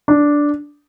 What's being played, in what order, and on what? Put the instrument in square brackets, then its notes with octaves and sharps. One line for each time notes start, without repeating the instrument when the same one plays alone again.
[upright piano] D4